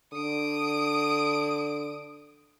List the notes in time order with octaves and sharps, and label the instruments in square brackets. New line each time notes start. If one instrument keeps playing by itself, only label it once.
[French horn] D3 [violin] D#6 D7